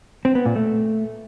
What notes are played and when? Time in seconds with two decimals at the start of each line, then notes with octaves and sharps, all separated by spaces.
0.25 C4
0.35 B3
0.45 A#2
0.56 A3